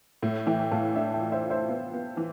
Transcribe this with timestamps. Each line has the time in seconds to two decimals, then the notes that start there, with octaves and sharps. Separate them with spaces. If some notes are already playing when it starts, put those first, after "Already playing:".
0.23 A2
0.47 E3 E5 G5
0.60 G5
0.71 A2 F5 A5
0.96 D4 E5 G5
1.14 E5 G5
1.20 F4
1.32 C5 E5
1.45 F4
1.50 C5 E5
1.69 B3
1.94 B3
2.17 E3